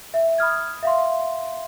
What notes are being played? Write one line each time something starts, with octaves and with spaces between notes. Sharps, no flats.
E5
B5 D#6 F6 G#6
E5 F5 C6